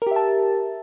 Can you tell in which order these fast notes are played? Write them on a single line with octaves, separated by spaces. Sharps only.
A#4 G4 E5 A5